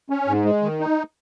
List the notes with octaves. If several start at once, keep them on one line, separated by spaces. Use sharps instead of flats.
C#4
G#2
G#3
D#3
D#4